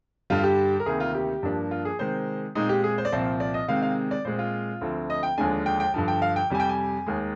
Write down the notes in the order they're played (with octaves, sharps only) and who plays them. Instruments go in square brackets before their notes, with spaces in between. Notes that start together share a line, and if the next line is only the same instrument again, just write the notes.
[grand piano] G2 D3 G3 F4
G4
A#4
D2 C3 D#3 A#3 G#4
F4
G4
G2 F3 A#3 D4
F4
G#4
C3 D#3 G#3 C5
A#2 G#3 C4 D#4
G4
G#4
C5
D5
C2 A#2 F3 C4 C5
D5
D#5
C3 D#3 G#3 C4 F5
F5
D5
A#2 G#3 C4 C5
F4
D2 D3 F3 C4
D#5
G5
D#2 D3 F3 G#3 D4 G#5
G5
G5
G2 D3 F3
G5
F5
G5
F2 C3 G3 G#5
G5
G#5
D#2 D#3 G#3